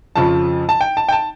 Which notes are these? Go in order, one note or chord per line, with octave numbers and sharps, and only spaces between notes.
F2 C#3 F3 A5
A5
G5
A5
G5
A5